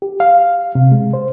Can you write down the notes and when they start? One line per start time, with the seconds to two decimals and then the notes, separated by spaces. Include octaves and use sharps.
0.02 G4
0.20 F5
0.75 C3
0.92 G#3
1.13 C5